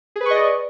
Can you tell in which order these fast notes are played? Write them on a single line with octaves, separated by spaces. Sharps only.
G#4 B4 C#6 D#5 D5